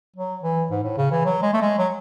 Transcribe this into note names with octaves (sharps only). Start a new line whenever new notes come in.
F#3
E3
G#2
A2
C#3
E3
F#3
G#3
A3
G#3
F#3